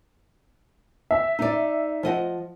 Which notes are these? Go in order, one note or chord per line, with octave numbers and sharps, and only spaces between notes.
E5
D#4 D5
F3 D#5 F#5